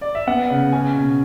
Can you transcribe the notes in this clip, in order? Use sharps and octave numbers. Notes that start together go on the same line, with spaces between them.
D5
E5
B3 F#5
C#3
C#4 G#5
B2